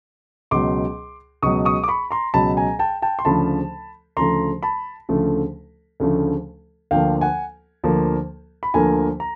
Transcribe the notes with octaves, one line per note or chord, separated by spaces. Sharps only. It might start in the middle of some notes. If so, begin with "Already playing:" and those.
C#2 B2 F#3 C6 D6
C#2 B2 F#3 C#6 D#6
C#6 D#6
D6
B5 C#6
A#5 C6
C#2 B2 F#3 A5 B5
G#5 A#5
G5 A5
G5 A5
C6
D2 C#3 F3 A3 A5 B5
D2 C#3 F3 A3 A#5 C6
A5 B5
D2 C#3 F3 A3
D2 C#3 F3 A3
D2 D3 F3 A#3 F5 G5
F#5 G#5
D2 D3 F3 A#3
B5
D2 D3 F3 A#3 G#5 A#5
A#5